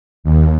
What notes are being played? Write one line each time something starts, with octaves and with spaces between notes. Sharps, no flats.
D#2